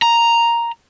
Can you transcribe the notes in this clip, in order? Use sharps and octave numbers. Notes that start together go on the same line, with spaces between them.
A#5